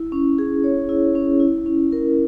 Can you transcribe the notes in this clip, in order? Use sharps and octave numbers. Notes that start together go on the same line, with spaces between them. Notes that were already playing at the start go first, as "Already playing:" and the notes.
Already playing: E4
C#4
G#4
C#5
E4
C#4
E4
C#4
A#4